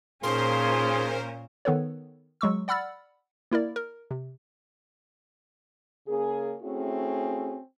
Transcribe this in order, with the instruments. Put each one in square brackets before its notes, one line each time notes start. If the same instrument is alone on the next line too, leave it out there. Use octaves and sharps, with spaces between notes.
[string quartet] A#2 C#4 [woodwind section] F3 D#4 G#4 [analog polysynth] A#4 C5 [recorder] C6
[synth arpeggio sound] D#3 B3 A4 B4 C#5
F#3 G#3 C#6 E6
D5 F#5 B5 E6 F6 A6
A#3 E4 A#4 D5
A#4
C3
[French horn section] C#3 A#3 C#4 G#4
A3 C4 C#4 E4 F#4 G#4